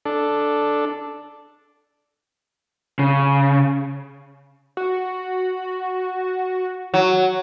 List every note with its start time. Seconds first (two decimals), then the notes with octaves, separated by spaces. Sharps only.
0.05 D4 A4
2.99 C#3
4.77 F#4
6.94 F#3